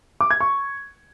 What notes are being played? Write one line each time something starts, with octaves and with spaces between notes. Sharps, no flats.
D6
G#6
C#6